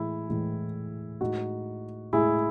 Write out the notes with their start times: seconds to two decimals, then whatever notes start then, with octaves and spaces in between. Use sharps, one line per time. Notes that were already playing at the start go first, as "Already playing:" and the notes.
Already playing: A2 E3 G#3 E4
0.29 A2 E3 G#3
1.21 A2 G#3 D#4 F#4
2.13 A2 G#3 E4 G#4